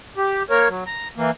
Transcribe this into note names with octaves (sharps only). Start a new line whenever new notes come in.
G4
A#3 A#4 C#5
F#3
A#5
E3 A#3